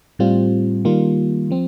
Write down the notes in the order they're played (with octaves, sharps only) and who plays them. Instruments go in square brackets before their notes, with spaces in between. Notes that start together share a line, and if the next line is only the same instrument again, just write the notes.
[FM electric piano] A2 G3 C4 F4
D#3 G3 A#3 F4
F3 C4